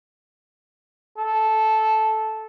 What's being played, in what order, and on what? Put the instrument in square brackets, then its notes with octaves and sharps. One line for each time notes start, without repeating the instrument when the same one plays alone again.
[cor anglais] A4